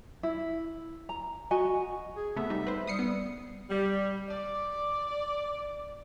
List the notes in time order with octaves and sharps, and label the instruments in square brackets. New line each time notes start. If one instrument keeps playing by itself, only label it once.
[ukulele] E4
A#5
F#4 D#5 G#5
[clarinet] G#4
[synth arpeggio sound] C3 A3 B3 [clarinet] E5
[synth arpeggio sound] G3 D#4
B4 C5
[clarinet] G3 [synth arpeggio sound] D#6 C7 C#7
[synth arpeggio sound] B3
[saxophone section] G3
D5